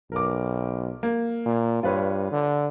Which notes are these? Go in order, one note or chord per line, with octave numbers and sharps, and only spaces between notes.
B1 A#4 D6
A#3
A#2
G2 F4 B4 C#5
D3